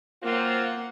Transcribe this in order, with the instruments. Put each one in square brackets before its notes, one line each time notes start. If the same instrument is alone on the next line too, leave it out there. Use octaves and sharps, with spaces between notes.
[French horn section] F#3 C4 F4 [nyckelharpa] A#3 [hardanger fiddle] F#5